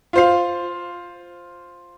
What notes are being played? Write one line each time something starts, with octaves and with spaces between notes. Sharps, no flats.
F4 C5 F5